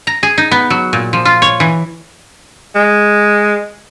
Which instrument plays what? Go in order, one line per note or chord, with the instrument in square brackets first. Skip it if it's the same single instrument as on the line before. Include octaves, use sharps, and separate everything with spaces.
[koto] A#5
G#4
D#4
B3
F#3
A#2
F3
F4
C#5
E3
[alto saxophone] G#3